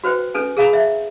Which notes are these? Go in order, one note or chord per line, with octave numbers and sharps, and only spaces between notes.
F#4 B4 C5 G5
C#4 A4 B4 G#5
G#4 A#4 F5 G#5 A#5 B5
E5